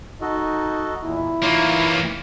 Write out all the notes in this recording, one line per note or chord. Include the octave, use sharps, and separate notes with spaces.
D#4 F#4 A4 D#5
E2 A#2 E4
E3 A#3 D#4 F4 C#5